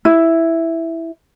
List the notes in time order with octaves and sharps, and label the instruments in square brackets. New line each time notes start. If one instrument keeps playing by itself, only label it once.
[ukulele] E4